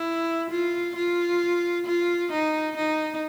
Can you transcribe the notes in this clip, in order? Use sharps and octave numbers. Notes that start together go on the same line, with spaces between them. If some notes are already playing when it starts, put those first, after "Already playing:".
Already playing: E4
F4
F4
F4
D#4
D#4